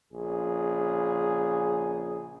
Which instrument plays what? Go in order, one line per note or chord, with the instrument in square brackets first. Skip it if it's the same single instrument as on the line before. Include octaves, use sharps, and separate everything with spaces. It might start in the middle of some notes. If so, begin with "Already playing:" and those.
[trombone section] A#1 C#3 G#4